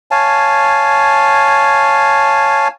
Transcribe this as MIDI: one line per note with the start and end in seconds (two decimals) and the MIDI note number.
0.11 2.68 73
0.11 2.68 77
0.11 2.68 80
0.11 2.68 81